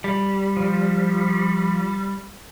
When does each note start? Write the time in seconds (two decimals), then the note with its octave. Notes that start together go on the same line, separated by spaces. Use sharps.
0.04 G3
0.57 F3